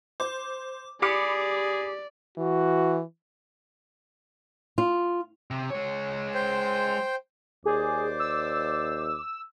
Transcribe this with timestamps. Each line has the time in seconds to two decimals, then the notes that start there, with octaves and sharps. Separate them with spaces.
0.20 C5 D6
1.02 G4 G#4 D5 B5 D6 C#7
2.38 E3 F#4
4.78 F4
5.51 C3
5.70 G#3 C#5
6.34 C5 G5
7.66 D#2 G#4 C5 D5 D6
8.20 E6